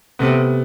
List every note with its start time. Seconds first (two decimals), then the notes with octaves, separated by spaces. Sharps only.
0.19 C3 A3 B3